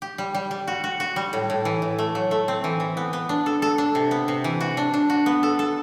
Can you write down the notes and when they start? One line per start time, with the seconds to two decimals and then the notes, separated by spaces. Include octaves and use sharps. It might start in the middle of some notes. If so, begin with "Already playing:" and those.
0.02 G4
0.18 G3
0.35 G3
0.51 G3
0.67 F#4
0.84 F#4
1.00 F#4
1.16 G3
1.33 A2
1.50 A2
1.65 E3
1.82 A2
1.99 A3
2.15 F#3
2.31 A3
2.48 C4
2.64 E3
2.80 E3
2.97 B3
3.13 B3
3.29 D4
3.46 A4
3.62 A4
3.78 D4
3.95 C3
4.11 B3
4.28 C3
4.44 E3
4.61 F#4
4.77 D4
4.94 D4
5.10 F#4
5.26 B3
5.43 A4
5.59 A4